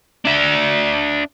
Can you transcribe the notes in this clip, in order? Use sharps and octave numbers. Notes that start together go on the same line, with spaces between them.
D4 E5